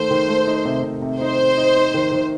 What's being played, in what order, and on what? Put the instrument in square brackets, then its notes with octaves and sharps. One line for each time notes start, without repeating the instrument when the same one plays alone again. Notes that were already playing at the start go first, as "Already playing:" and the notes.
Already playing: [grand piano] D#3 A3 [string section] C5
[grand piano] D#3
A3
D#4
C3
C3
C3
[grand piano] D#4 [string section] C5
[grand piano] D#4
D#4
D#4
D#3
D#3